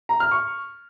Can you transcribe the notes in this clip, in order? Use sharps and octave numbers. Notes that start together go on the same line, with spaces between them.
A#5
F6
C#6